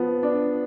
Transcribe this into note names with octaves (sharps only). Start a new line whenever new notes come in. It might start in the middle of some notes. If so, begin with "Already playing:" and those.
Already playing: F3 B3
D4